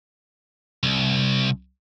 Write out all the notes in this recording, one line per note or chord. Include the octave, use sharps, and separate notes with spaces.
C2